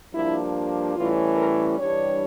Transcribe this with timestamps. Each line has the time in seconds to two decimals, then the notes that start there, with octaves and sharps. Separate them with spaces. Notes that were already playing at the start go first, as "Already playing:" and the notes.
0.13 G2 F3 A#3 D4 E4
0.96 A2 E3 G3 C#4 F4
1.37 A#4
1.79 G2 E3 G3 D4 C#5